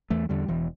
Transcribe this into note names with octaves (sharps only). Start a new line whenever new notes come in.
E2 E3 A3
E2 D3 G3
E1 E3